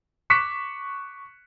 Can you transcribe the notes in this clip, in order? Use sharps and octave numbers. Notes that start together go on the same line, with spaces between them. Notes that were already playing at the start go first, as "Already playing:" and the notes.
C#6 D6 F#6 B6 C#7 E7